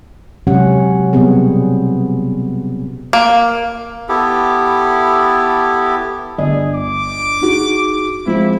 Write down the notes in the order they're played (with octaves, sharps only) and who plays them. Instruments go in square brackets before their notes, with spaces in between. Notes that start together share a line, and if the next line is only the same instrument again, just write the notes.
[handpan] C3 F#3 G#3 C#4 G4 F#5
B2 F#3 G3 B3 C4 G#4
[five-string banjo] A#3
[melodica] B3 E4 G4 A4
[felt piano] G1 D5 D#5 [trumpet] G#4
[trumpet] D6
[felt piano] D#4 F#4 G#4
[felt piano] F3 G#3 C4 [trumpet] E4